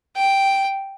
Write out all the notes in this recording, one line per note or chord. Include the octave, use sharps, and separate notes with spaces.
G5